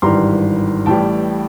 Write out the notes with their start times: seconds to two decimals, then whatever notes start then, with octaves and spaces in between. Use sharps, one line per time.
0.02 G#1 G2 E3 G3 A#5 C6
0.86 A1 A2 E3 G3 G5 A5